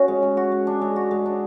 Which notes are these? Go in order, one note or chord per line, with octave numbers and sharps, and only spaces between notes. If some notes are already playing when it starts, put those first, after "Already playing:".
Already playing: C#4 F#4
G#3
G#3
F#4
G#3
D4
G#3
F#4
G#3
D4